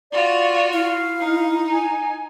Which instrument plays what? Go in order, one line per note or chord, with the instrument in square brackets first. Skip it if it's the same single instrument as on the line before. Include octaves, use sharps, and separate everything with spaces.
[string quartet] F4 F#4 [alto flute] D5
[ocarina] E4 [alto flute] F5
[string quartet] D#4
[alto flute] G#5